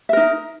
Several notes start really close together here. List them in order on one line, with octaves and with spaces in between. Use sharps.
E5 A#4 D#4